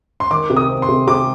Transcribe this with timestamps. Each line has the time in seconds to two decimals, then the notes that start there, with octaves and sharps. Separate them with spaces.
0.20 C6
0.31 D#3 D6
0.50 C3
0.57 D#6
0.69 C4
0.82 C6
0.89 C3
1.08 C3 D6